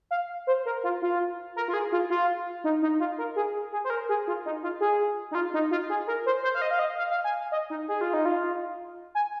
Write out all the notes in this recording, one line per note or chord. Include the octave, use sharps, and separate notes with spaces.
F5
C5
A#4
F4
F4
A#4
F4
G#4
F4
F4
D#4
D#4
F4
A#4
G#4
G#4
C5
A#4
G#4
F4
D#4
F4
G#4
D#4
F4
D#4
F4
G#4
A#4
C5
C5
F5
D#5
F5
D#5
F5
F5
G#5
D#5
D#4
G#4
F4
D#4
F4
G#5